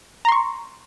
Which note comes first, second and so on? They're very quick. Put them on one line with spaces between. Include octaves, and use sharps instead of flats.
A#5 C6 C#6